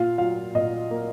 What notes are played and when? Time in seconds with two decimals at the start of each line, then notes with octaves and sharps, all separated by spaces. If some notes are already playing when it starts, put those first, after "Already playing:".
Already playing: A#2 F4 F5
0.18 F#3 F4 F5
0.55 A#2 D#5
0.91 A#3